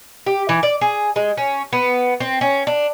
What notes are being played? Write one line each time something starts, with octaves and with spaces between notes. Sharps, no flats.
G4
E3
D5
G#4
G#3
C#4
B3
C4
C#4
D4